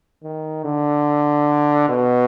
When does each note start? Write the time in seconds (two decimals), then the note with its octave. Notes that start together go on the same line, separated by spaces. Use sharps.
0.23 D#3
0.65 D3
1.89 B2